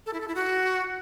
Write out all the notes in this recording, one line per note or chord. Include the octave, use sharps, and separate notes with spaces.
A4
E4
A4
E4
F#4